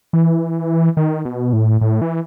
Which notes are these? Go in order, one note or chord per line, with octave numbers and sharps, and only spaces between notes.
E3
D#3
B2
A2
A2
E3